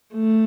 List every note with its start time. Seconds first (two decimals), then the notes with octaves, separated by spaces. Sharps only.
0.14 A3